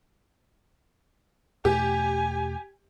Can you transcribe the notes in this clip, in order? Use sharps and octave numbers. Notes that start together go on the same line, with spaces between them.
E2 B2 A3 G4 G#5